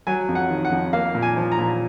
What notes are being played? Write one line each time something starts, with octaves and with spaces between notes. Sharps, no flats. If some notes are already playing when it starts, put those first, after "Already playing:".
F#3 G#5
F2
F#5
D#3
F#5
F2
A#3 F5
A#2
G#5
F3
A#5
A#2